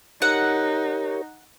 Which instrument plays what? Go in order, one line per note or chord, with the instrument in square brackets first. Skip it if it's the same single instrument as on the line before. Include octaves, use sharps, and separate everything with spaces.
[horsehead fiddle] D#4 [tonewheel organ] G4 A#4 C#5 [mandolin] F#5